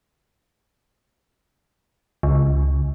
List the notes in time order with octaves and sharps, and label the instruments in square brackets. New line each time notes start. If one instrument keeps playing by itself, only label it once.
[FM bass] C#2